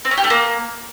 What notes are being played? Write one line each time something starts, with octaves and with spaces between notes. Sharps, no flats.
C4
C#4
G4
A3
A#3